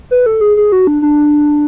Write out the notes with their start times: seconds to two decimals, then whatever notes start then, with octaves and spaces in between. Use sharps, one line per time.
0.11 B4
0.26 A4
0.41 G#4
0.57 G#4
0.72 F#4
0.87 D4
1.02 D4